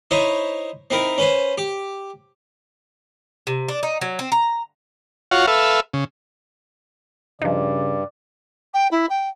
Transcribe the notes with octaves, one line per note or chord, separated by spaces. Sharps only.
D#4 E4 C5 C#5 D#5
C4 D#4 E4 A#4
C#4 B4 C5
G4
C3
D4
D#4
F#3
C4
A#5
F4 F#4 C#5 F5 F#5
A4 B4 E5 F5
C#3
G2 C#3 F3 D#4 D5
G5
E4
G5